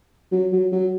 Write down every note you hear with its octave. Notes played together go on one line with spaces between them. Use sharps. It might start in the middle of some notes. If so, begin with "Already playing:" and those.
F#3
F#3
F#3